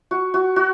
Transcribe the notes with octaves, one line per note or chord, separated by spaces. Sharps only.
F#4
F#4
F#4